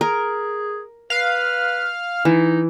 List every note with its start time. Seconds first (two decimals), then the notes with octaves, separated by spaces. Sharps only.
0.01 G#4 A#4
1.10 B4 F5
2.25 E3 D#4